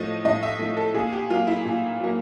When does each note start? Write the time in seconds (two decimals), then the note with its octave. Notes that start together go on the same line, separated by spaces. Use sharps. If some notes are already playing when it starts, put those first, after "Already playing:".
Already playing: A2 F3 A3 D#5
0.25 A2 D#5
0.43 E5
0.59 F3 A3
0.77 A4
0.94 A#2 G#4
1.12 G4
1.30 F#3 A#3 F4
1.47 E4
1.65 A#2
2.00 F#3 A#3